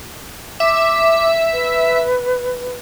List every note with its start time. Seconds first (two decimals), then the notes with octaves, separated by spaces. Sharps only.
0.60 E5 D6
1.52 B4